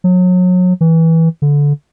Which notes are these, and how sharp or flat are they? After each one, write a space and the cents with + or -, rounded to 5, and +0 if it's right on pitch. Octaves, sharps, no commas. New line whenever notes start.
F#3 -30
E3 -15
D3 -20